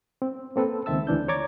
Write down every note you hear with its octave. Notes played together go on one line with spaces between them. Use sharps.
C4
A#3 C4 A4 B4
C#2 D#3 C4 E5 A5 E6
D2 E3 D4 G6
C#5 D5 A#5 D6 G#6 A6